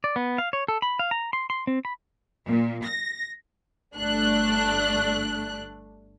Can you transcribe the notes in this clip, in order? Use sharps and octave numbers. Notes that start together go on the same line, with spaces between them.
D5
B3
F5
C#5
A4
B5
F5
A#5
C6
C6
C4
B5
A#2
A#6
G1 A3 D4 F#6